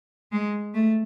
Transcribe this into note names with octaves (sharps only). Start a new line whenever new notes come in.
G#3
A3